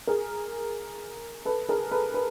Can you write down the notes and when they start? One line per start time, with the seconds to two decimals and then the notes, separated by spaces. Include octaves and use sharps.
0.07 G#4 A#4
1.45 A4 B4
1.69 G#4 A#4
1.91 A4 B4
2.14 B4